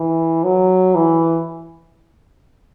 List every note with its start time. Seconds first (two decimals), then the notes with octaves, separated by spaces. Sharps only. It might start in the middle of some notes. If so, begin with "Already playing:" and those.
Already playing: E3
0.44 F#3
0.95 E3